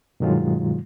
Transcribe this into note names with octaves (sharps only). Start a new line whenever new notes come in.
G2 B2 D#3 F#3 G#3 F4